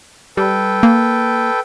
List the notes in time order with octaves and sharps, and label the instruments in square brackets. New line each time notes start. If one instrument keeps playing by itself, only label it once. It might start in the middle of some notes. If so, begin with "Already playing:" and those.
[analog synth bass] G3 [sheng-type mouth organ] A4 B4 G5
[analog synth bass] A#3